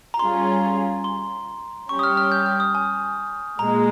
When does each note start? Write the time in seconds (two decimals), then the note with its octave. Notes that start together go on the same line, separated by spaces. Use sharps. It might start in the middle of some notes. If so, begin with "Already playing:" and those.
0.14 A#5
0.19 G3 C#4 F4 G#4 C6
1.04 C6
1.89 G3 C#4 G4 C#6
1.99 D#6
2.03 F6
2.17 F6
2.32 G6
2.46 F6
2.60 D#6
2.75 G#5
3.59 A#2 G#3 A#5